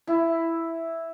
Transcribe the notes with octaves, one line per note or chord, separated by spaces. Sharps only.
E4